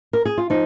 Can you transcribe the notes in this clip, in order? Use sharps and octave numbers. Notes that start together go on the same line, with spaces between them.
A#4
G#4
F4
F3 D#4